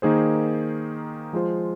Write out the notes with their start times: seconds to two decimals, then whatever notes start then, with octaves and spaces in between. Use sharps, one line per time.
0.02 D#3 A#3 D#4 G#4 C5
1.33 F3 G#3 F4 C5